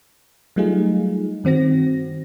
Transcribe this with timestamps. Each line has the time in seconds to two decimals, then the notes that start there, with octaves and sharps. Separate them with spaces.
0.56 F#3 G3 A3 D#4 F4 G#4
1.44 G2 D#3 C4 F#4 A#6